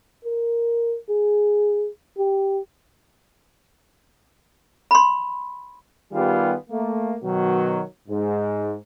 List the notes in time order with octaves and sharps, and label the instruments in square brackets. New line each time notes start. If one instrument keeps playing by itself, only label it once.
[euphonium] A#4
G#4
G4
[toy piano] B5 C6
[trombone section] D#3 G3 B3 F4 G4 G#4
A3 A#3
B2 D#3 F#3
G#2